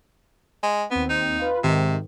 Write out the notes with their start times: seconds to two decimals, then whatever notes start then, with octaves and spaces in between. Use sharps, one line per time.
0.63 G#3
0.91 D#2 B3 C4
1.10 D#4
1.39 F4 B4
1.64 G#2 C3 D#3